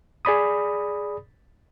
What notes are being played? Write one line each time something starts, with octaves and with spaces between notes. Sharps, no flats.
G#4 D5 B5 D#6